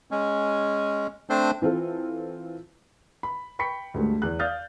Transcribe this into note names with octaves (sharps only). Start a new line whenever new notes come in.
G#3 C#4
A3 C4 D4 C5
E3 C4 F4 A4
B5
G5 B5 C#6 B6 C#7
D2 G#2 G3 A3
E2 F#6
D5 F5 D#6 F6 G6 A6